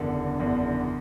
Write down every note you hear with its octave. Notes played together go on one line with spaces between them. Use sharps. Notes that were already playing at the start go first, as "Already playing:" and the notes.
Already playing: F#1 E2 D3
F#1 E2 D3